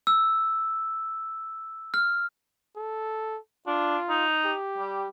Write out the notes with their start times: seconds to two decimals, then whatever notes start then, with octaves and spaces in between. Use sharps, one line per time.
0.07 E6
1.94 F6
2.77 A4
3.67 D4 F4
4.09 D#4
4.45 G4
4.78 G3